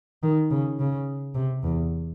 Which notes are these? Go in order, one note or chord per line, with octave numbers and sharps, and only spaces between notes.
D#3
C#3
C#3
C3
E2